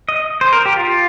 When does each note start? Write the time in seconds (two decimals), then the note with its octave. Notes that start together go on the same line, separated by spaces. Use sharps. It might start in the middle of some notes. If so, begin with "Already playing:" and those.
0.09 D#5
0.41 C5
0.53 A#4
0.66 G4
0.77 F4